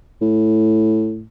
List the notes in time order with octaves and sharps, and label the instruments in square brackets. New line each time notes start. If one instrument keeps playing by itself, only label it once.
[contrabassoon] A2